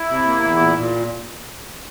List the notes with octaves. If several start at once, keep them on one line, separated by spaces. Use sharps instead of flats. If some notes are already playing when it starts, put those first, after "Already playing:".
Already playing: E4
C3
A#3
E2
A#2
A#2